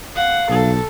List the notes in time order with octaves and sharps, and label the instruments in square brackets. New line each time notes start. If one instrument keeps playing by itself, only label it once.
[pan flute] F5 [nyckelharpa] F#5
[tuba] B1 [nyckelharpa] A4